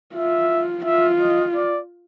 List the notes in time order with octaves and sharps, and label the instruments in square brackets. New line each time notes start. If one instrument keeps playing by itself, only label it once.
[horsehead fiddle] F4 [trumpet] E5
[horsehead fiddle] F4 [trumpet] E5
[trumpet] D#5
D5